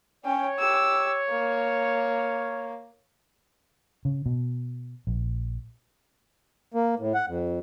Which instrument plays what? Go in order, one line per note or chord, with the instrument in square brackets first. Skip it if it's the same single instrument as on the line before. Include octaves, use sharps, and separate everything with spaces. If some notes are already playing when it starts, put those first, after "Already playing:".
[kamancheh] C#4 G5 [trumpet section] C#5
[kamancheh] G4 E6
A#3
[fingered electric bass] C#3
B2
A#1
[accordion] A#3
A2
F#5
F2